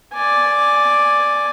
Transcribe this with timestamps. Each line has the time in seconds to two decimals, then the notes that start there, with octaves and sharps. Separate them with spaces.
0.13 D5 G#5